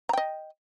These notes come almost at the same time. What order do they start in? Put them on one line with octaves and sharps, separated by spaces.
A#5 G5 D#5